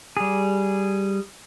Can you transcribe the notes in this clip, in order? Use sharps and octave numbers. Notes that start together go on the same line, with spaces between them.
G3 G#4